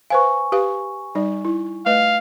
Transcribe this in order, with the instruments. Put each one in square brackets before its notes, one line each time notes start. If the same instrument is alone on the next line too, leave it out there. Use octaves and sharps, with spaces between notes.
[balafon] B4 C5 F5 [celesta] G#5 C#6
[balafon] G4 B4 F5
G3 D#4 D5
E4
[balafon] A3 B4 D#5 [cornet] F5